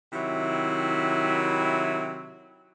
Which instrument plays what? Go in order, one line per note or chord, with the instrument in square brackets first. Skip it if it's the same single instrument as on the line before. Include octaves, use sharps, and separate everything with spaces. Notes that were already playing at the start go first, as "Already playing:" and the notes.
[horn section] C3 D#3 F#3 E4